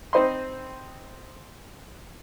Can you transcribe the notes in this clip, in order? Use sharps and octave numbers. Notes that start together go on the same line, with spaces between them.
C4 D#4 C5 D#5 B5 C6